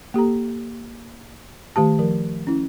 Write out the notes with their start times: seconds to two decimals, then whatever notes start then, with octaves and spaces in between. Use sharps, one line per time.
0.14 A#3 G4 A4 A#5
1.76 D#3 A3 G4 A5
1.99 F3 A#4
2.47 C#4 E4